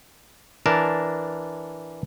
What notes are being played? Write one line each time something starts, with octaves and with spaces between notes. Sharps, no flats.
E3 D4 A#4 A5